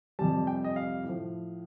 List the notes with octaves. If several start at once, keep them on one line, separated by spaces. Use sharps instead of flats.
F2 C3 G3 A5
G5
D#5
F5
A2 F3